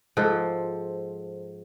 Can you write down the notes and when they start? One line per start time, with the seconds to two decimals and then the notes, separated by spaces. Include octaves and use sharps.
0.17 G#2 F3 A4